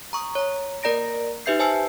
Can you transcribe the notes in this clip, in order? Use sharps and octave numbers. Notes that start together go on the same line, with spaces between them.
A#5 C#6 D#6
C#5 A#5
A#3 A#4 D5 A#5 A#6 D7
D#4 G4 B4 E5 G6 C7
C5 G#5 A5 E6 C7